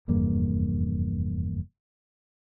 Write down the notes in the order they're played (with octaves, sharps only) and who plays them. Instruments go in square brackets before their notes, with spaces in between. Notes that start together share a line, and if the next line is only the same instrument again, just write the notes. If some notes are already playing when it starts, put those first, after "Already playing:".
[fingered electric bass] F1 E2 G2 A#3